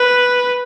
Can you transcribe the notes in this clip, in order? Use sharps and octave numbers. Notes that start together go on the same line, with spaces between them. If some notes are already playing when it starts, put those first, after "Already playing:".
Already playing: B4